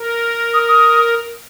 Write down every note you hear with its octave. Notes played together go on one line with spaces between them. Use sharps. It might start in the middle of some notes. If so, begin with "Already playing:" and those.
Already playing: A#4
D#6
D#6